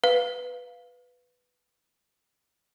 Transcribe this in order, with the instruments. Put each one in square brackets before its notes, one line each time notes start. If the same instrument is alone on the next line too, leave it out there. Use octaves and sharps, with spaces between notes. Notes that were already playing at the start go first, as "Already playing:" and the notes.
[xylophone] B4 F5